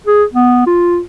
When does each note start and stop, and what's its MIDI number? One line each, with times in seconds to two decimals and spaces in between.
0.07 0.24 68
0.34 0.64 59
0.67 1.00 65